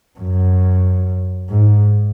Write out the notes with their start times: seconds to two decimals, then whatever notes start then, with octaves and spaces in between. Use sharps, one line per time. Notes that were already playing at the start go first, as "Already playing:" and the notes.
0.19 F#2
1.50 G#2